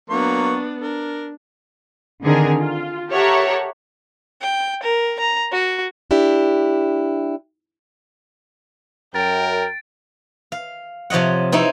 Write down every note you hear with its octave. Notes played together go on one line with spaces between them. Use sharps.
F#3 A#3 B3 D4 C#6
D4 A#4
D3 D#3 C4 D4 G#4 A#4
F4
G4 A4 A#4 C#5 E5 F#5
G5
A#4
A#5
F#4
D4 E4 G4
F#2 A#4 G5 A6 D7
F5
C3 F3 C#5 D#5 F#5
C4 D#4 E4 C#5